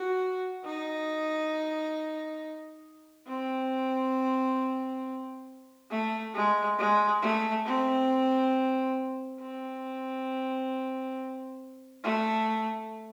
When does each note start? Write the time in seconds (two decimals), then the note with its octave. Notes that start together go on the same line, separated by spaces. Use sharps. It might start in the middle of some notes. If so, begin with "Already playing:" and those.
Already playing: F#4
0.65 D#4
3.28 C4
5.91 A3
6.35 G#3
6.78 G#3
7.22 A3
7.66 C4
9.41 C4
12.04 A3